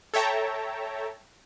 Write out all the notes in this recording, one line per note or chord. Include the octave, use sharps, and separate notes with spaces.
A4 C#5 E5 G5 A5 A#5